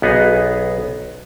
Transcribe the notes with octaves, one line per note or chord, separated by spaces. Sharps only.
B1 B3 D#4 G#4